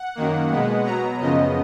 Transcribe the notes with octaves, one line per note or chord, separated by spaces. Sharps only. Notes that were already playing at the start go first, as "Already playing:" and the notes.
Already playing: F#5
F#2 D#3 A#3
B2 G#3 B3
B2 F#3 B3 A#5
F#2 C#3 F3 B3 D#5